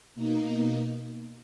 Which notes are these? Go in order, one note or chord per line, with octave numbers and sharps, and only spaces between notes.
B2 A#3 D#4